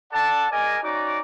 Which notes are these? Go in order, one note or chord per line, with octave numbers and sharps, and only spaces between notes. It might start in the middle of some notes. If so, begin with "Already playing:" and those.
A4 D5 F#5 A5
G#4 A#4 D5 D#5 G#5
C#4 D#4 F#4 D5 A#5 D6